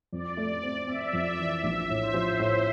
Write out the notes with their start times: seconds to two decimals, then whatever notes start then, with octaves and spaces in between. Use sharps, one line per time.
0.13 F2 D5
0.37 A3
0.63 C4
0.88 C4 E5
1.13 F2
1.39 E3
1.64 A#1 E5
1.89 A2
2.02 C5
2.14 F3
2.40 A2